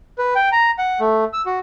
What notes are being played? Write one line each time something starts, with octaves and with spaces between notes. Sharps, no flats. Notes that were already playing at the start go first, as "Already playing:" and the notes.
B4
G5
A#5
F#5
A3
E6
F#4